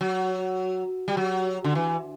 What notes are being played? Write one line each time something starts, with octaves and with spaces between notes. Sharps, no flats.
F#3
G3
F#3
D3
E3